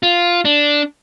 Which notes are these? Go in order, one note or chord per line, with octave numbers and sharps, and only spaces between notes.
F4
D4